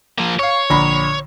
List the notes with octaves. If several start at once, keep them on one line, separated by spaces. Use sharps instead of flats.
F3 A#3
C#5 F5 C#6
A#1 D3 A#5 B5